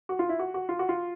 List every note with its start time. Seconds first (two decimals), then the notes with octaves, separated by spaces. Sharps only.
0.09 F#4
0.19 F4
0.29 E4
0.39 F#4
0.54 F#4
0.69 F4
0.79 F#4
0.89 F4